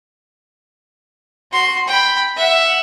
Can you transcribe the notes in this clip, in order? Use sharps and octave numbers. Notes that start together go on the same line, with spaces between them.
F#4 C6
G5 B5
E5 F#5